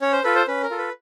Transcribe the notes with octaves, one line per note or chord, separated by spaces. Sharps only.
C#4 C#5
C5
F4 A4 B4
C5
C#4 B4
A#4
F4 A4
B4